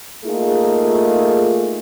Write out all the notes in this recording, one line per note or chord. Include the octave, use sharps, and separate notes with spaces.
A3 A#3 D#4 F4 G#4